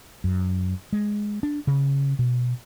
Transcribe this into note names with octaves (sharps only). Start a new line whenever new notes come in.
F#2
G#3
D4
C#3
B2